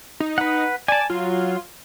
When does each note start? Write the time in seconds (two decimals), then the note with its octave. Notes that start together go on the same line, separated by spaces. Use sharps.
0.20 D#4
0.38 B4 F#5
0.88 D5 G#5 A5
1.10 F#3 F4